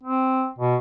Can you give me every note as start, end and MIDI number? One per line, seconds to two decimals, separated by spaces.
0.04 0.47 60
0.58 0.76 47